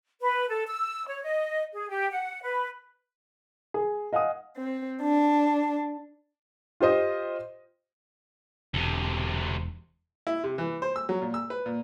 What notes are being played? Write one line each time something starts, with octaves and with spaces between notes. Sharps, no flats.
B4
A4
E6
C#5
D#5
G#4
G4
F#5
B4
G#4
D#5 F5 F#5 G#5 D#6
C4
D4
F4 G4 C5 D#5
E1 D2 C3
E4
C3
E3
C5
E6
F#3
A#2
E6
B4
A#2